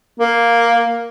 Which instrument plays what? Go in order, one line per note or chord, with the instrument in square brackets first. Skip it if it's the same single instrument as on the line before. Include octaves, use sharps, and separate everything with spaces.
[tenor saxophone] A#3